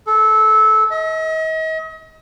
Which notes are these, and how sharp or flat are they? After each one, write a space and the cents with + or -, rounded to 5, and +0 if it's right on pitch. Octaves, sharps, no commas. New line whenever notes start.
A4 -20
D#5 +40